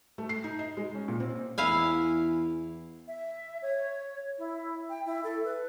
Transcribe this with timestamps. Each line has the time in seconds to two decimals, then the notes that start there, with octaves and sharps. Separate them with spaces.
0.18 A3
0.29 C7
0.44 D#4
0.59 D#5
0.77 G#3
0.95 C#4
1.08 A#2
1.20 C4
1.58 E2 E4 F5 G#5
3.08 E5
3.62 C#5
4.39 E4
4.89 G5
5.06 E4
5.24 A4
5.45 B4